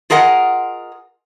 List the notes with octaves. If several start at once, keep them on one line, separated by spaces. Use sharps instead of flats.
F4 G#4 A#4 D#5 F#5